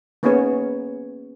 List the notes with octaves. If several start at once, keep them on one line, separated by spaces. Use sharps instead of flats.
A#3 B3 C#4 D#4 G#4 C#5